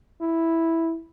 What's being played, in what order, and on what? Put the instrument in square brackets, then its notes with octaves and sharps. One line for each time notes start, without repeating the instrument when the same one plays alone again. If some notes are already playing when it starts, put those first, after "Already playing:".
[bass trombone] E4